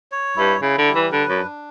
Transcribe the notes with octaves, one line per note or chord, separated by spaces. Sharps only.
C#5
G2 E4
C#3 E4
D3
G3
E3
D3 B4
F#2
D4